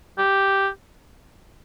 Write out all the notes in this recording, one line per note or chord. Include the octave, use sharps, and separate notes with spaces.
G4